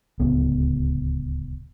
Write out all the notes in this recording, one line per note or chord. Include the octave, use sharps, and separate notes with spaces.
D1 C#2 B3